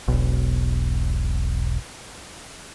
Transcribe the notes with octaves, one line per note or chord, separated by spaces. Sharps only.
E1 B1